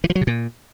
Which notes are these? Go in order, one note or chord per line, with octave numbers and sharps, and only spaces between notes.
E3
F3
F#3
C3
A#2